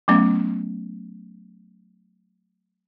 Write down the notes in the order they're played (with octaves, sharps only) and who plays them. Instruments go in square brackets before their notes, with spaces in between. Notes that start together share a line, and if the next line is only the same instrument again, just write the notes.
[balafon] F#3 A3 B3 C#4